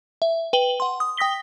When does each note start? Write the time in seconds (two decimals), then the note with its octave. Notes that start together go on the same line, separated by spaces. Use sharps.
0.22 E5
0.53 B4 G5 F#7 G7
0.80 F#5 C6
1.00 D#6
1.17 G5 D#6 A#6 B6 G7